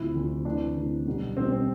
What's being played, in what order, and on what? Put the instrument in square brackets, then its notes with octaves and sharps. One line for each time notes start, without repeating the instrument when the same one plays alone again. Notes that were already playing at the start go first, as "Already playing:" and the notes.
Already playing: [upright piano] D2 C3 F3 E4
D2 C3 F3
D2 C3 E3 D4
D2 C3 E3
B1 B2 G3
B1 B2 G3 C4
C4